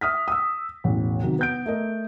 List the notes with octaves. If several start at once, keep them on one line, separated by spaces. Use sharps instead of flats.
E5 D#6 F6 B6
D#6 E6
E1 A1
C3 D#3 F#3
B3 G6 D7
A3 A#4 D#5